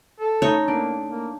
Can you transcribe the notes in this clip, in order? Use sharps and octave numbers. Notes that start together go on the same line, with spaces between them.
A4
A3 D#4 C#5
A#3 D4
A#3